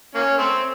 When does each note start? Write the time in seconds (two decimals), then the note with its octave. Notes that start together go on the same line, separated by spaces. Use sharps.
0.15 A#3 C#4
0.38 A3 C4